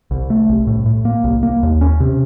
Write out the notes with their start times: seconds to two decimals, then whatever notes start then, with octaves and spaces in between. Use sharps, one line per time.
0.11 C2
0.30 A3
0.49 C2
0.67 A2
0.86 A2
1.05 A#3
1.24 C2
1.43 A#3
1.63 D#2
1.81 C#4
2.00 C3